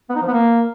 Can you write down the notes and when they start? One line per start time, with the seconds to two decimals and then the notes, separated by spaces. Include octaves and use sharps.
0.10 B3
0.16 D#4
0.22 F3
0.27 B3
0.33 A#3